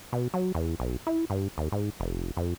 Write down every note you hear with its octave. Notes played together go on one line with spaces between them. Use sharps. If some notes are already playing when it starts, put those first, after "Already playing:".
B2
F#3
E2
B1
E4
G2
D#2
G#2
F1
F2